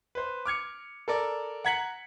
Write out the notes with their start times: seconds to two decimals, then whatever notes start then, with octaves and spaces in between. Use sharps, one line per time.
0.15 B4 C5
0.46 D6 F6 G#6 C#7
1.08 A4 A#4 D5
1.65 F#5 A#5 G#6 B6 C#7 F#7